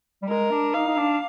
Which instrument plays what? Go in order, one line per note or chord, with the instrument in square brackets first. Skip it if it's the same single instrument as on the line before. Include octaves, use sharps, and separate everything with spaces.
[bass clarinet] G3
[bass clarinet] G#3 [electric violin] A#4
[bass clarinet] D4
[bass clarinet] D#4 [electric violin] F5
[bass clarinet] D#4
D4